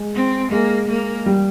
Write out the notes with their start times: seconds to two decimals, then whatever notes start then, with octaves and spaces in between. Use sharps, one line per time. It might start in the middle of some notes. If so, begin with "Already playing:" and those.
Already playing: G#3
0.15 C4
0.51 G#3 A#3
0.89 A#3
1.26 G3